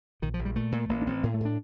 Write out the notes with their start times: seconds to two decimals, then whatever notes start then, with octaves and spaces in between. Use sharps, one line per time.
0.22 A#1 D#3
0.34 F3
0.39 A#1
0.45 G3
0.56 A#2 A3
0.72 A#2
0.89 A1 A#3
1.02 D4
1.07 A1 C4
1.23 A2 A#3
1.34 A3
1.41 A2 D4